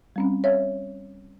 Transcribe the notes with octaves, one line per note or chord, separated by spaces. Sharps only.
G3 C4 C#4
C#5 E5 F5